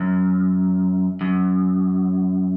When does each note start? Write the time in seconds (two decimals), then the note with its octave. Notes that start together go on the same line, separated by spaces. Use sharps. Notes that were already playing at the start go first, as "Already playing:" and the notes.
Already playing: F#2
1.21 F#2